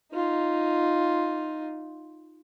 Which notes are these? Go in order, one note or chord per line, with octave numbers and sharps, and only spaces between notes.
D#4 F4